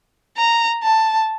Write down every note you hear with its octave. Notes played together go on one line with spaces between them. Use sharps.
A#5
A5